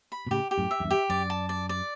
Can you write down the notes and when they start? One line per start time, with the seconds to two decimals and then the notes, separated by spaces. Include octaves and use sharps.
0.12 B5
0.26 B2
0.31 A2 C#3 G4
0.51 G4
0.58 F#2 A2
0.71 E5
0.80 F#2
0.84 E2 G2
0.91 G4
1.09 F#2 D5
1.30 A5
1.49 D5
1.69 D5